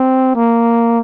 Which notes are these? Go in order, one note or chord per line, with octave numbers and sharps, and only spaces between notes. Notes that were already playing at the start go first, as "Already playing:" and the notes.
Already playing: C4
A#3